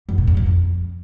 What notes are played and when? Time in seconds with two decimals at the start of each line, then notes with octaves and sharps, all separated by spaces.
0.09 F#2
0.18 A#2
0.27 E2
0.37 F#2
0.46 F2